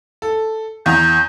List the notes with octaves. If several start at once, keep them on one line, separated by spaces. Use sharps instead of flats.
A4
E2 A#5 G6